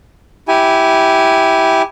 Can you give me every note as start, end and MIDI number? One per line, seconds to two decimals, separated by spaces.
0.48 1.82 64
0.48 1.82 67
0.48 1.82 80